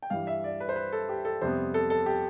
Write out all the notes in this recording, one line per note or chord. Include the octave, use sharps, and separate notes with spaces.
G5
G2 E3 G3 F5
E5
D5
B4
C5
B4
A4
G4
A4
F2 C3 G3 B3 C5
A4
A4
G4